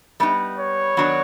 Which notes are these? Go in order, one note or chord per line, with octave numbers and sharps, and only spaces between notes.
G3 B3 D#4
C#5
D#3 F#3 B3 D4 F#4